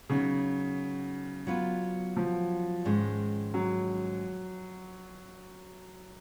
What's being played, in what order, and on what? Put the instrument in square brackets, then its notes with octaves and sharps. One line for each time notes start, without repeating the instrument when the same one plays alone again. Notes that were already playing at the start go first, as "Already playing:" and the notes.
[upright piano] C#3 [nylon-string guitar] F#3 B3 D#4
[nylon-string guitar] F#3 B3 F4 B4
[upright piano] F3
[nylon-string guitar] G#2 D#3 G#3 C#4
[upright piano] F#3